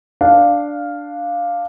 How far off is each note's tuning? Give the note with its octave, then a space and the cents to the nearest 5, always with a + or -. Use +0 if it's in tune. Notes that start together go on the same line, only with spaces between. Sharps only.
D4 +0 F5 +0